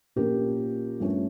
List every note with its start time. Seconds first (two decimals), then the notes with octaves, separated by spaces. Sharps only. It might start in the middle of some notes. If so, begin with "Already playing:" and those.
0.16 A#2 F3 A#3 C#4 G4 A#4
1.00 G2 F3 A3 C#4